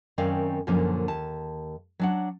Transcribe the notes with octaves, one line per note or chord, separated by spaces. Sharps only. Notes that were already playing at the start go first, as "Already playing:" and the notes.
F#2 D#3 C4 C#4 D5 F5
F#2 A#2 D3 F3 A#3 C#4
D#2 A5
F#3 D4 F#5